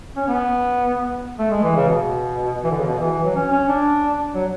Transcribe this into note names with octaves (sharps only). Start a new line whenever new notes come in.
C#4
B3
A3
G#3
E3
C#3
B2
E3
D3
C#3
B2
E3
E3
F#3
C#4
C#4
D4
F#3